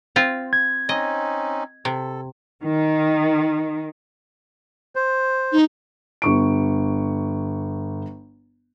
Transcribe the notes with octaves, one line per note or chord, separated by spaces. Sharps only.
C4 F4
G#6
C4 C#4 D#4 D#5
C3 A4
D#3
C5
D#4
G1 C#6 D7